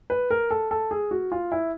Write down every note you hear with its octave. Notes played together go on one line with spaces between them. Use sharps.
B4
A#4
A4
A4
G#4
F#4
F4
E4